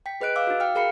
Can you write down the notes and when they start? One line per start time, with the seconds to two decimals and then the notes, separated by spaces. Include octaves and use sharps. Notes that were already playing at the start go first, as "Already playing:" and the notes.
0.06 G5 B6
0.21 G#4 B4 D#5 F#6 D7
0.36 F5 D6 E6
0.47 D#4 F#4
0.60 F5 G5 F6
0.75 G#4 A#4 F5 B5 C7 C#7